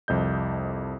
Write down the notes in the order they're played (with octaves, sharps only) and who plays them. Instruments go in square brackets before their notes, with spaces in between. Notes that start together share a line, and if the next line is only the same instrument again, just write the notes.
[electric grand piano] C2 F2 D#5 G6